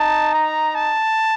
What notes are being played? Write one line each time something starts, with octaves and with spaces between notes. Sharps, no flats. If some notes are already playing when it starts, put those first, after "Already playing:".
Already playing: D#4 A5
A#5
A5